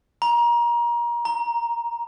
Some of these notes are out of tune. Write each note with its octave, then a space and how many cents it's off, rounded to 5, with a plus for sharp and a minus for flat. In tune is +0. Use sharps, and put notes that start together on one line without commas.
A#5 +30
A#5 +5